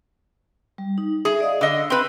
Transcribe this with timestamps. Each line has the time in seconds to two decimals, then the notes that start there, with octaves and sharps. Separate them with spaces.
0.78 G3
0.98 D#4
1.25 G#4 E5
1.40 D5 D#5 F5
1.61 D3 D#5 E6
1.90 C4 B4